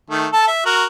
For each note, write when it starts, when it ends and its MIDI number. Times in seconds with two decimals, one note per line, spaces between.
0.10 0.27 51
0.10 0.27 57
0.33 0.47 69
0.33 0.47 81
0.48 0.63 76
0.66 0.85 66
0.66 0.85 70